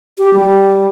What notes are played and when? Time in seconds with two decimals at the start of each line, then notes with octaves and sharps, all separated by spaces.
0.18 G4
0.33 G3